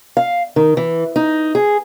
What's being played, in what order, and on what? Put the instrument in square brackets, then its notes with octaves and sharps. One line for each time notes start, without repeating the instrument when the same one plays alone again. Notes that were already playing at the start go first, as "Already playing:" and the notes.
[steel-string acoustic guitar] F5
D#3
E3
D#4
G#4